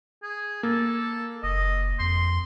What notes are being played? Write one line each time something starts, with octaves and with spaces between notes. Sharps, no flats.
G#4
A#3 A4
F#1 D#5
F2 C6